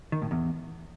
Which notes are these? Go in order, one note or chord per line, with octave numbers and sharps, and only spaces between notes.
D#3
A2
E2